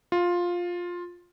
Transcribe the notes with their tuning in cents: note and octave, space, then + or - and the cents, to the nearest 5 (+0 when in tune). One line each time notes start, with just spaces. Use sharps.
F4 +10